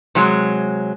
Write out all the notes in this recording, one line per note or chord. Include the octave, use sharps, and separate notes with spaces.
C3 F#3 G#3